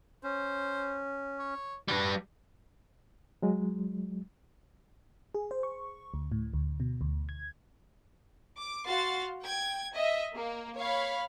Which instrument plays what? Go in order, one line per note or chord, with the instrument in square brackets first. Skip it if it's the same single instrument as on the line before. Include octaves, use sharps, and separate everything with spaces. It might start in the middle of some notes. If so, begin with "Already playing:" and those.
[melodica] C#4 [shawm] C5
[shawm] C#5
[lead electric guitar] G3 B4 [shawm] F#4
[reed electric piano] F#3 G#3
[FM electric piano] G#4
C5
C#6
D2
A2
D2
B2
D2
G#6
[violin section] D6
F#4 F5 C6 A6
G5 G#6
D#5 E5
A#3
C#5 F5 B5